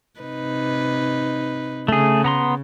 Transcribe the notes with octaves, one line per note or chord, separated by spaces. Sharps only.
C3 D#4 B4
C#3 A3 G#4
B3 A#5 C6